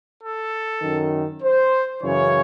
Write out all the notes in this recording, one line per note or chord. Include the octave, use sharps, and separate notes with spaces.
A4
F#2 D#3
C5
F#2 C#3 E3 C#5